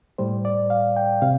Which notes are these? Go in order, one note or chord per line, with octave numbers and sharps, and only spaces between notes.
A2 G3 C5
D5
F5
G5
C3 F5